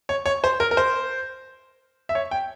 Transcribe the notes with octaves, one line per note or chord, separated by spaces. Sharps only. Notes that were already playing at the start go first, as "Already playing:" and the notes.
C#5
C#5
C5
A#4
A#4
C5
E5
C#5
G5